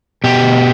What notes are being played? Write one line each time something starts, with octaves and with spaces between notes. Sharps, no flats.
B2 G4